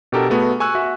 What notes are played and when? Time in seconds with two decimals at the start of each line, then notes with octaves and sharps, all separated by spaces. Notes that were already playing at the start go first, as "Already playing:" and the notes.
0.12 B2 D4 G4 A4 A#4
0.30 A3 B3 F#4 G#4
0.60 G#5 C#6 E6 F#6
0.75 F#4 E5